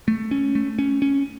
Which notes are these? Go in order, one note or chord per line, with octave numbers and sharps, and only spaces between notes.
A3
C#4
A3
C#4
C#4